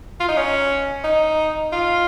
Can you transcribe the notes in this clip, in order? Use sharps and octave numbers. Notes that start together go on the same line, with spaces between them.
F4
D#4
C#4
D#4
F4